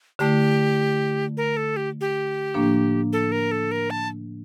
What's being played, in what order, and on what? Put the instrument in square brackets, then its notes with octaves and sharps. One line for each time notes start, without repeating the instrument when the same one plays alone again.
[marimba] D3 A3 E4 [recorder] G4
[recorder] A#4
A4
G4
G4
[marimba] A2 F3 A#3 D4
[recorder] A4
A#4
A4
A#4
A5